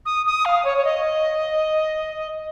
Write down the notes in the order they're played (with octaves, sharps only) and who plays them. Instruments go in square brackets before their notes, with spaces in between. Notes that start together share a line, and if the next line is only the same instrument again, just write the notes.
[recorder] D#6
D#6
F5
C#5
C#5
D#5